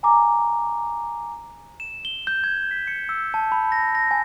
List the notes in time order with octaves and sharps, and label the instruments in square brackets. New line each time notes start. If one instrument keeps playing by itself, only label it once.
[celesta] G#5 A#5 D6
[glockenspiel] E7
G7
G6
G#6
B6
C#7
E6
A5
B5
A#6
A#6
G#5